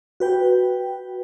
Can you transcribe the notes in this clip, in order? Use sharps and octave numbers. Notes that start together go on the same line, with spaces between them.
F#4 B4 G5